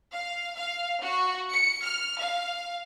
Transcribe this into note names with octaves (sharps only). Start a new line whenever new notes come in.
F5
F5
F#4
C#7
F6
F5